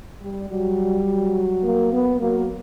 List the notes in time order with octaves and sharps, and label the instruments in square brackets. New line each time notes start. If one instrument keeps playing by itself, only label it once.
[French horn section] G3
[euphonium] F#3 [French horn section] G3
[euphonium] F#3
[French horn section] A#3
B3
[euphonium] F#3 [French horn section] A#3